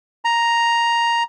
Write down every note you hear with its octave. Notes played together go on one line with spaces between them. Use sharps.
A#5